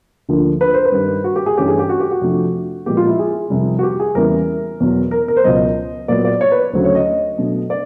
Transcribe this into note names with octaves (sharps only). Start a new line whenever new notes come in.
D2 D3 F3 A#3
B4
C5
B4
G2 D#3 G3
F#4
G4
G#4
G2 E3 A3 C#4 G4
G#4
G4
F#4
G4
F#4
F2 C3 F3 A3 D4
A#2 F3 G#3 B3 G4
F4
E4
G#4
F2 C3 D#3 G3
F#4
G4
G#4
E2 C#3 E3 G3 A#3 A#4
E2 B2 F#3
A#4
A#4
C5
C#2 B2 F#3 D#5
A#2 F#3 B3 D5
D5
C#5
B4
D2 C#3 F#3 A3 C5
C#5
D#5
D#5
B2 F#3 A3 D4
D5